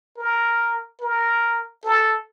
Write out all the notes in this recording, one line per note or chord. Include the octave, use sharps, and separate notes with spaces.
A#4
A#4
A4